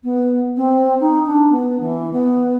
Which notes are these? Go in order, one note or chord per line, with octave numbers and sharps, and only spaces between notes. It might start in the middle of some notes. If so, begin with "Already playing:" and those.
B3
C4
D#4
D4
B3
E3
B3